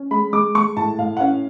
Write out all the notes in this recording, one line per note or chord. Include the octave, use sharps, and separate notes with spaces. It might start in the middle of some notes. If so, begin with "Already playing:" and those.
Already playing: C#4
G#3 B5
G#3 D6
G#3 C#6
A2 A5
A2 F5
F#5
C#4 F5